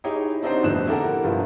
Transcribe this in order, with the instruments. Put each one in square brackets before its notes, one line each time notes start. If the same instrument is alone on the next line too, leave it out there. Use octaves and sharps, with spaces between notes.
[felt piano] D#4 E4 G4 G#4 C#5
C4 D4 D#4 F#4 G4 C5
G1 F2 A2 D3 F#6 E7
E4 G4 A4 A#4 F#5
G1 G2 F3 F4